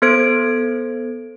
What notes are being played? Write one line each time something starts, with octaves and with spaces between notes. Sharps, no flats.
B3 A4 C5 G#6 D7